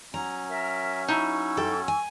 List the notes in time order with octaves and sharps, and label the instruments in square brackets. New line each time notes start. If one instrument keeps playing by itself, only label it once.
[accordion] F#3 C#4 [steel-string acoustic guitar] A#5
[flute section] A#4 E5
[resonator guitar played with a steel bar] D#4 E4 [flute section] C#6 E6
[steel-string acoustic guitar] F#2 A4 G5
G#5